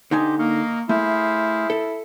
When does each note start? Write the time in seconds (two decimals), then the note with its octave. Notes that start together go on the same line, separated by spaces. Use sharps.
0.11 D3 D#4 G4 C5 D#5 G#5
0.39 A#3 D#5 F5 C#6
0.89 A3 E4 G#4 C5 F5
1.70 A4